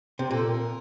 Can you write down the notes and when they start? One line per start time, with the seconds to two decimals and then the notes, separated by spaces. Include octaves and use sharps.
0.19 C3
0.31 A#2 A4
0.47 A#4